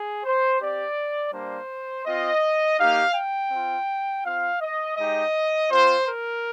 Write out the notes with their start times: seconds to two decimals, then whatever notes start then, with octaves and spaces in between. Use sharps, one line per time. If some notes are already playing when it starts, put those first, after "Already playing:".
Already playing: G#4
0.24 C5
0.60 C4 G4 D5
1.32 G3 A#3 D4 C5
2.05 C4 F4 D#5
2.79 A#3 D#4 G4 F5
3.15 G5
3.51 C4 F4
4.24 C4 F4 F5
4.61 D#5
4.97 G#3 D#4 G4 D#5
5.70 C4 F4 C5
6.07 A#4